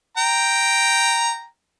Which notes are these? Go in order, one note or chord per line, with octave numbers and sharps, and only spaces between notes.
G5 A#5